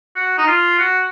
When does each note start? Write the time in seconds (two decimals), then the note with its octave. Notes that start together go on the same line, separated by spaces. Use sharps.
0.16 F#4
0.38 D#4
0.47 F4
0.79 F#4